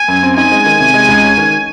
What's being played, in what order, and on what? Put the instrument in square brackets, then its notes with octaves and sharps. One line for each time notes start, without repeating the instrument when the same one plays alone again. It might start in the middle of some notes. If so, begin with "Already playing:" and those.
Already playing: [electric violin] G#5
[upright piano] F#2
C4
[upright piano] D#4 [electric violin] G#5
[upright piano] G#3
D#3
C3
G#3
C#2
C#4
D#3